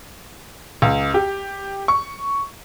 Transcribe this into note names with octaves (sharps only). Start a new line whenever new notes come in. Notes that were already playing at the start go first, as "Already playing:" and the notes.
C#2
G4
C#6